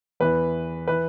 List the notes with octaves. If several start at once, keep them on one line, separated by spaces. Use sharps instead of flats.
E2 E3 B4
E3 B4